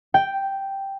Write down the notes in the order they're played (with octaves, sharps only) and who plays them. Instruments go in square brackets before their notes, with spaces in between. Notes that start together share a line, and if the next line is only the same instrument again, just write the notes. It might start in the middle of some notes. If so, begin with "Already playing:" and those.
[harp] G5